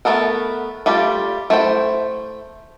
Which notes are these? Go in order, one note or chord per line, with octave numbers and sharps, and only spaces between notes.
A3 B3 A4 A#4
G3 A3 F4 G4
A3 E4 C5 G5